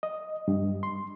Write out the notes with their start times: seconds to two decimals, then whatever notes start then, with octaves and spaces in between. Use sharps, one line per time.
0.03 D#5
0.48 G2
0.83 C6